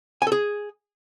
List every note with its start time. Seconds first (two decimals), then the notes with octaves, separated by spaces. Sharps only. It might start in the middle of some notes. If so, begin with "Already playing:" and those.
0.22 G#5
0.27 A4
0.32 G#4